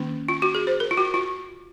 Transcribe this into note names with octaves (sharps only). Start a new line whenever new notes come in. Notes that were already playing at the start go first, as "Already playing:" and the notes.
Already playing: D#3 A#3 C#4
F4
F#4
G#4
C5
A#4
F4
F#4
F4